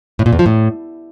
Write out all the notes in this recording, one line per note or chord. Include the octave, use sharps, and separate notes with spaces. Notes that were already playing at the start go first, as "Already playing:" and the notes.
A2
A#2
E2
F3
A2